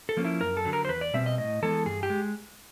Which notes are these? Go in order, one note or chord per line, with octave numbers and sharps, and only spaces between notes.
A4
F3 A#3 C#4
E4
F#2 A#4
A4
D3 F#3
A#4
C5
E2 B4
D5
B2 G3 C4 E5
D#5
A2 D#5
E3 G#3 B3 A4
G2 G#4
G4
G#3